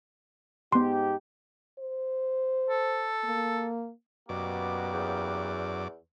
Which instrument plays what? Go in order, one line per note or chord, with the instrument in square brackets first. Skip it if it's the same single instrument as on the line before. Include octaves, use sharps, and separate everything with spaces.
[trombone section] G#2 D#4 G4 [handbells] B3 C6
[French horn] C5
[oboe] A4
[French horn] A#3
[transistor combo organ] F#2 D5 [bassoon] B2 [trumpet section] A#3 B3 G4
[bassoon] E2